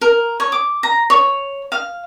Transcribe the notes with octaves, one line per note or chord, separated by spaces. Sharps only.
A#4
C#5
D6
A#5
C#5
F5